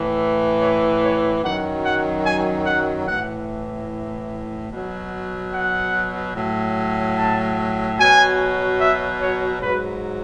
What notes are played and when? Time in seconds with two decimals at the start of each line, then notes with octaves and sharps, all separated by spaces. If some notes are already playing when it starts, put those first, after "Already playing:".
Already playing: A2 E3
0.61 C#5
1.02 C#5
1.42 F#2 D#3 F#3 F#5
1.83 F#5
2.24 G#5
2.65 F#5
3.06 A2 E3 F#5
4.70 B2 F#3
5.52 F#5
6.34 A2 F#3
7.16 A5
7.98 B2 F#3 G#5
8.80 E5
9.21 C#5
9.61 G#2 F#3 B4